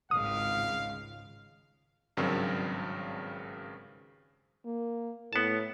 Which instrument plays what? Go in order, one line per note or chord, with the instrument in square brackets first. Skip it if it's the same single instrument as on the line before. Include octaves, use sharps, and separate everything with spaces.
[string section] G#1 C#2 G#2 [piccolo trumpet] F5 [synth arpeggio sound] D#6
[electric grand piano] G#1 G2 C#3 F#3 C4 A#4
[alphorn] A#3
[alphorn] A2 [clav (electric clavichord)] B3 A5